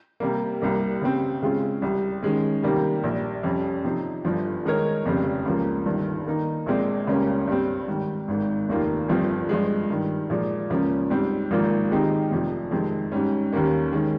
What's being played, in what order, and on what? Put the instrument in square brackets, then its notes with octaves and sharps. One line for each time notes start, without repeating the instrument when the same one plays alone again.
[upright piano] C3 G3 A#3
C2 C3 G3 A#3
C#3 G3 C4
C#3 G#3 C4 F4 G#4
C2 C3 G3
D#3 G#3 C#4
C3 D#3 G3 A#3
A#1 A#2 G3
F2 C3 G3 C#4
C3 F3 C4 D#4
G1 G2 F3
D#3 G#3 D#4 A#4 C#5
F1 F2 C#3 G3 C4
C#2 C#3 F3 A#3
G1 G2 D#3
D#3 A#3 D#4
A#1 A#2 G#3 C4
C#2 C#3 G3 A#3 C#4
G2 G3 C4
G#2 D#3 G3
G#1 G#2 D#3
F1 D#2 D#3 A#3 F4
G1 G2 F3 C4
G2 F3 G#3
G2 D#3 G3
A#2 F3 G#3
C#2 C#3 F3 A#3 C#4
G#2 G3 C4
G#1 G#2 F3 A#3 F4
D#3 G#3 C4 D#4 G4
F1 F2 C3 F3
F2 C3 D#3 G#3 C4
G#2 G3 C#4
D#2 D#3 G3 A#3 C#4
D#3 G#3 C#4